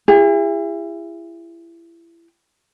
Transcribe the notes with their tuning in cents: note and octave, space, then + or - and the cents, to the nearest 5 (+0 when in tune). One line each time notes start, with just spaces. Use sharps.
E4 +30 G#4 -45